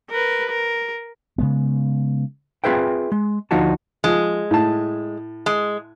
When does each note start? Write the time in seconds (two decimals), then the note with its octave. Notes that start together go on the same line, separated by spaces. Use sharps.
0.10 A#4 B4
0.49 A#4
1.38 C#3 G#3 B3
2.64 C4 F4 G#4 B4 E5 G5
3.12 G#3
3.51 D2 F3 D#4 F#4 A5
4.04 F3 G#3
4.51 A2 A5
5.46 G#3